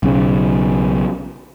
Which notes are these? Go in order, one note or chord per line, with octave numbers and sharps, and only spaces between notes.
B1 C#3